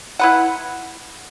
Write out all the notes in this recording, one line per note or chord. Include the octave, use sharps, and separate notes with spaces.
E4 B4 F#5